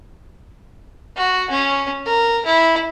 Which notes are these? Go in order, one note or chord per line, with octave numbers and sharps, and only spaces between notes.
F#4
C#4
A#4
E4